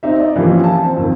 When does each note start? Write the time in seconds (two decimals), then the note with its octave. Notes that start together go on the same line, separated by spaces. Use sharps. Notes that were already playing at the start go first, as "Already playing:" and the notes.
0.03 C4 D#4 E5
0.19 D5 D#5
0.36 E3 F3 G3 A#3 C#4
0.64 A5
0.84 C4
0.97 F2 D#3